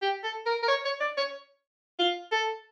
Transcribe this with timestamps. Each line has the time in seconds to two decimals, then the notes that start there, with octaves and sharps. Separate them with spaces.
0.02 G4
0.24 A4
0.46 A#4
0.63 A#4
0.68 C#5
0.85 C#5
1.01 D5
1.18 C#5
1.99 F4
2.32 A4